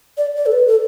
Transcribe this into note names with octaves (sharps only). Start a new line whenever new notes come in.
D5
D5
A4
B4
A4